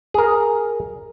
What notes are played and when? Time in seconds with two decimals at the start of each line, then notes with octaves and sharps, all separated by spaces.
0.14 G#4 A#4